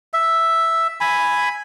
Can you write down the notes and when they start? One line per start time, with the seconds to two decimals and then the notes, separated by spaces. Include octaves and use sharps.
0.13 E5
1.01 G#5 B5